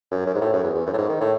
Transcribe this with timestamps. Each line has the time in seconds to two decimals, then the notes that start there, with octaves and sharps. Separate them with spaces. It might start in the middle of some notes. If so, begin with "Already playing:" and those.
0.11 F#2
0.26 F#2
0.35 G#2
0.41 A2
0.53 F#2
0.63 E2
0.75 E2
0.86 F#2
0.94 A2
0.98 G#2
1.09 D#3
1.20 A2